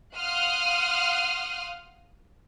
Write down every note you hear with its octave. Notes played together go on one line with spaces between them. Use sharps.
F5 F#5 C6 D#6 F6 F#6